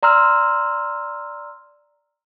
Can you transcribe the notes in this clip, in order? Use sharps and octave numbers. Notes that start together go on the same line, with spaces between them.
D5 A#5 C6 E6 F6